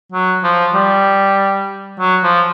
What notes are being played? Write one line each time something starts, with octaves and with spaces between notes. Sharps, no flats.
F#3
F3
G3
F#3
F3